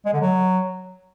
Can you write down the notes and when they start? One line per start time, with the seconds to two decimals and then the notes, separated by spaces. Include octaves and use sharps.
0.05 G#3
0.13 D3
0.21 F#3